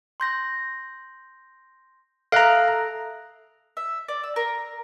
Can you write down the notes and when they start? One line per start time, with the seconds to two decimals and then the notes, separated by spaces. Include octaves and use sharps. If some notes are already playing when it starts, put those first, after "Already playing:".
0.20 C6 G6 A#6
2.32 A4 E5 F5 A#5 F#6
3.77 E5
4.08 D5
4.23 E6
4.36 A#4